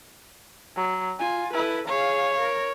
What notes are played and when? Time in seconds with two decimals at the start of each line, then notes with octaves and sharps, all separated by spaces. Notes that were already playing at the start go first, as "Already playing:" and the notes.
0.76 F#3
1.20 F4 G#5
1.54 E4 A4 B4
1.88 G#4 C#5 F5
2.40 A#4